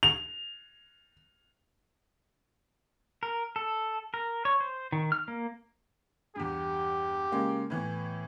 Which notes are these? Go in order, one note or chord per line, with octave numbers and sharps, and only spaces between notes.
F7
A#4
A4
A#4
C#5
C5
D#3
F6
A#3
E2 G2 G4
C#3 G#3 A#3
A2 E3 B3